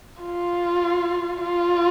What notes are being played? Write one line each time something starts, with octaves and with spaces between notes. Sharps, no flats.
F4
F4